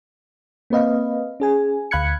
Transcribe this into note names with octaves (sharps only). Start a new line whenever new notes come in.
A#3 C4 B4 D#5 F5
C#4 G#4 G#5
D2 F5 B5 F#6 G#6 C#7